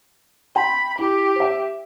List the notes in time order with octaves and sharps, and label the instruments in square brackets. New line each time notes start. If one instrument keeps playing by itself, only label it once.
[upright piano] G5 C6 [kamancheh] B5
[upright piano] E4 [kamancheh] G4
[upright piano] C5 E5